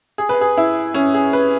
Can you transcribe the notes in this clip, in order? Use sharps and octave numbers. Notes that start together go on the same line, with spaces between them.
G#4
B4
G#4
E4
C#4
G#4
B4